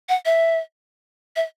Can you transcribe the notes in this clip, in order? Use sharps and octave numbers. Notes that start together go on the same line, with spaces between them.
F#5
E5
E5